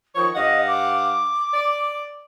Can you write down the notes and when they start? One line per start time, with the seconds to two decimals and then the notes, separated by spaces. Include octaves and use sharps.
0.15 D#3 F3 C#5 C#6
0.35 G2 D#5 F5 F#5
0.67 D6
1.53 D5